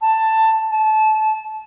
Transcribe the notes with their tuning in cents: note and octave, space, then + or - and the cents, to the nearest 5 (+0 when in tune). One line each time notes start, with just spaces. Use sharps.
A5 +10
A5 -25